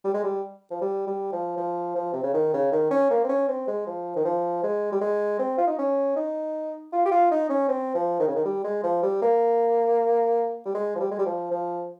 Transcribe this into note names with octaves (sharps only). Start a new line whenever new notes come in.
G3
G#3
G3
F3
G3
G3
F3
F3
F3
C3
C#3
D#3
C#3
D#3
C#4
A#3
C4
C#4
C4
G#3
F3
D#3
F3
G#3
G3
G#3
C4
F4
D#4
C#4
D#4
F4
G4
F4
D#4
C#4
C4
F3
D#3
C#3
D#3
G3
G#3
F3
G3
A#3
G3
G#3
F3
G3
G#3
G3
F3
F3